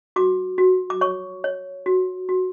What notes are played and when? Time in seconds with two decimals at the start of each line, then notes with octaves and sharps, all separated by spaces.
0.16 F#4 D6
0.58 F#4
0.90 D6
1.01 C#5 C#6
1.44 C#5
1.86 F#4
2.29 F#4